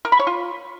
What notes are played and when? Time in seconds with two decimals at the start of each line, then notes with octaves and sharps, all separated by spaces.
0.05 A#4
0.12 B5
0.19 C#5
0.27 F4